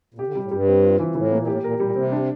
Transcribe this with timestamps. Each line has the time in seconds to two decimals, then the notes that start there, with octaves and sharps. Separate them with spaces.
0.14 A#2
0.18 C3 G4
0.27 D3
0.34 C3 G3
0.43 A2
0.51 G2 G3
0.67 C4
0.84 F4
0.99 E3
1.15 A2 E3
1.32 A#3
1.38 A#2
1.47 A2 G4
1.63 A#2 A#4
1.80 A#2 G3
1.96 C3 C4
2.12 D4